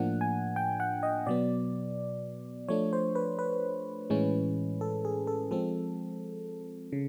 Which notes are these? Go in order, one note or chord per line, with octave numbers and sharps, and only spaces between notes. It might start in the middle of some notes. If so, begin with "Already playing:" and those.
Already playing: A2 F3 A#3 D4 F#5
G#5
G5
F#5
D#5
B2 F#3 B3 D5
F3 A3 D4 C#5
C5
B4
B4
A2 E3 G#3 C#4
A4
G#4
A4
F3 G#3 C4 A4
C#3